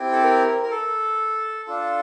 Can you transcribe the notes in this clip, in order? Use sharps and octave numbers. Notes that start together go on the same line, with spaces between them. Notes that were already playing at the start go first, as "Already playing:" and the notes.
Already playing: C4 E4 G4
A4
A#4
A#4
A4
D4 F4 A4